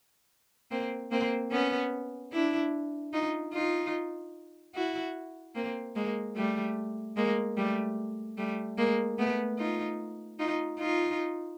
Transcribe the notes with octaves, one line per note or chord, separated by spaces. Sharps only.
A#3 C4
A#3 C4
B3 C#4
D4 E4
D#4 F4
D#4 F4
E4 F#4
A#3 C4
G#3 A#3
G3 A3
G#3 A#3
G3 A3
G3 A3
G#3 A#3
A3 B3
D#4 F4
D#4 F4
D#4 F4